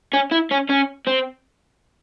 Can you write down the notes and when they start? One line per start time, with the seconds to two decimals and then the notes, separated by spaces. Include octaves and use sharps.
0.13 C#4
0.31 E4
0.51 C#4
0.69 C#4
1.07 C4